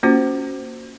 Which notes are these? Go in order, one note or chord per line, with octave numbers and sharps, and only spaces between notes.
A#3 C#4 F4 F#4 C5